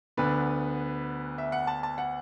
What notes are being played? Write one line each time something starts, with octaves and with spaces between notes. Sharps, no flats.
D2 D3 B3 D4 B4
E5
F#5
A5
A5
F#5